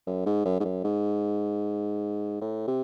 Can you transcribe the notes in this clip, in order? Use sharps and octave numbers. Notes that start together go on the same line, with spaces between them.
F#2
G#2
F#2
G#2
F#2
G#2
A2
C3